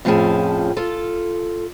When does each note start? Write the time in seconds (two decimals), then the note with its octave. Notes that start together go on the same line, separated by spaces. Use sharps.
0.05 F2 A2 F3 C#4 G#4 A5
0.76 F4 A4